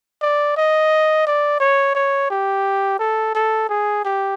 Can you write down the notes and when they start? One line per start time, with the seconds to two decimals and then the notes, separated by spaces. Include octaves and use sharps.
0.22 D5
0.57 D#5
1.27 D5
1.60 C#5
1.95 C#5
2.31 G4
2.99 A4
3.35 A4
3.69 G#4
4.05 G4